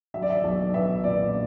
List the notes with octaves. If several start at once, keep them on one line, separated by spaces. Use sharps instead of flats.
F#3 E5
D5
E5
B1
B3 E5
A#2 D5